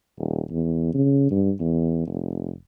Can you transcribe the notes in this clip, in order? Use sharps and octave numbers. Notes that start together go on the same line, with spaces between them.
D#1
E2
C#3
G2
E2
F1